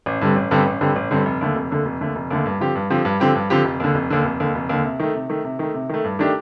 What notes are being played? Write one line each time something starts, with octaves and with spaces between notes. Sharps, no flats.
A1
G2 D3 G3 C4
A1
G2 D3 G3 C4
A1
G2 D3 G3 C4
A1
G2 D3 G3 C4
F1
D#2 D3 A3
F1
D#2 D3 A3
F1
D#2 D3 A3
F1
D#2 D3 A3
G2
D3 F3 C4 G4
G2
D3 F3 C4 G4
G2
D3 F3 C4 G4
G2
D3 F3 C4 G4
F1
D#2 D3
F1
D#2 D3
F1
D#2 D3
F1
D#2 D3
C3
D#3 A3
C3
D#3 A3
C3
D#3 A3
C3
D#3 A3
G2
D#3 A3 D4 G4